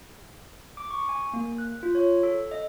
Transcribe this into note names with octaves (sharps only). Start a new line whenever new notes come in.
D6
C#6
G#5
A#3
F#6
F4
C#5
A4
D#5